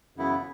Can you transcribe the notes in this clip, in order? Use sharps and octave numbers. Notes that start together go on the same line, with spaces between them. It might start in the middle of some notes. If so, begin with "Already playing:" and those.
F#2 C#3 E3 B3 E4